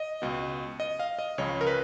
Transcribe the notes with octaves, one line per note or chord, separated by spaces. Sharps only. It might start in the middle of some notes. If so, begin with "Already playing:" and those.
Already playing: D#5
C#2 B2
D#5
F5
D#5
C#2 C#3 F3 C#5
A#4
B4